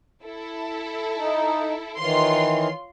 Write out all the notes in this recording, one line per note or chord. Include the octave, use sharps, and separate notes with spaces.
E4 A4
D#4
D#3 E3 F4 C#5 C6